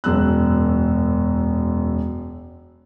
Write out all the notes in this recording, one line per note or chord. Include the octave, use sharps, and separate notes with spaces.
E1 F#2 E6 F#6